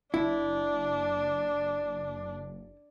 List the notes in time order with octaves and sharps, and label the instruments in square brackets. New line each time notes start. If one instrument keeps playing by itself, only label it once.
[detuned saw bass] F#1 [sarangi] D4 [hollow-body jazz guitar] E4